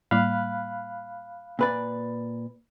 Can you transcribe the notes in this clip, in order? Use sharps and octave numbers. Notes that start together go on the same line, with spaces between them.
A2 G3 A#3 F5 B5 F#6
A#2 B4 D5